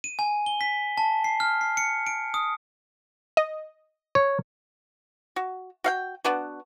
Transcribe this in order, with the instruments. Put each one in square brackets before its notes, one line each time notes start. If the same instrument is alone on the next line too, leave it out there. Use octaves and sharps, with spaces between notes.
[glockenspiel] D#7
G#5
G7
B6
A5
C7
F6
C7
C#7
D7
D#6
[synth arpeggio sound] D#5
[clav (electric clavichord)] C#5
[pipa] F#4
F#4 F5 G5
B3 D4 F#4